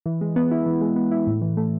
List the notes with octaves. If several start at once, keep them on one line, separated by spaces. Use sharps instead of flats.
E3
G#3
B3
E4
E3
G#3
B3
E4
A2
E3
A3